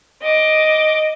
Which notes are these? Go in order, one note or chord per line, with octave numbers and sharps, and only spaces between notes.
D#5 D6